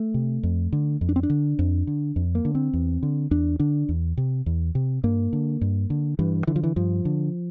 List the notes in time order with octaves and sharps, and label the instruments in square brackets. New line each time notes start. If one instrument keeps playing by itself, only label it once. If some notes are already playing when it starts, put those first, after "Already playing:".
Already playing: [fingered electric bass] A3
C3
F2
D3
F2
D4
C4
D4
D3
F2
D3
F2
A#3
D3
C4
E2
D3
E2 D4
D3 D4
E2
C3
E2
C3
G2 A#3
D3
G2
D3
G2 E3
D3 E3
F3
E3
G2 F3
D3